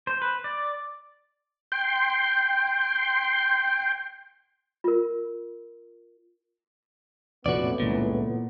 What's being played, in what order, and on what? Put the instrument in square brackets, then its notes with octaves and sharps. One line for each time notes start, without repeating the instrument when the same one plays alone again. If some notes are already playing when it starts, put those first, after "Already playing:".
[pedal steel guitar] C5
B4
D5
[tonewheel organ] G5 C6
[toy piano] F4 A#4
[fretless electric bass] F1 A#1 F2 [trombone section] A2 B3 [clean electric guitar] F#4 D5
[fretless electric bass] G1 C#2 E3 [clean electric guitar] A#2